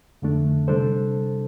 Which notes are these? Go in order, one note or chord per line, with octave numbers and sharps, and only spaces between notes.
F2 D3 A3 D4
C3 G3 D4 A4 C5